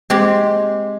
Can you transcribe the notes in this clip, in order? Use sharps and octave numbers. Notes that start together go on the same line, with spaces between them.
G#3 C4 G4